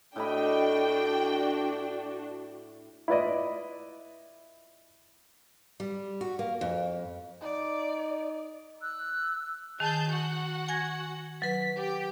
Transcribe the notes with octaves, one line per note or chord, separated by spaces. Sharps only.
A2 D4 F#4 D#5 G5 B5
E4 F4 B4 D5 D#5
G3
F#4
A#3
F2
D#4 D5
E6 F#6
D#3 G#4 A5 G6
F#4 F#5
G#5 G#6 A#6
F#3 B4 B6
G4 G5